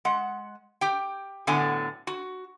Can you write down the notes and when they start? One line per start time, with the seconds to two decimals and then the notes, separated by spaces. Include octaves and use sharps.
0.05 G#3 F#5
0.81 G4 G5
1.47 A2 D3 F#3 B3 F#5 G#5
2.07 F#4